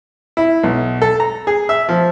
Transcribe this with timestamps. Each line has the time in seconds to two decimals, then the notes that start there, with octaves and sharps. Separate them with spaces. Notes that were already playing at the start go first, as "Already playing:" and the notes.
0.37 E4
0.63 B1
1.02 A4
1.20 A#5
1.47 G#4
1.69 E5
1.89 F3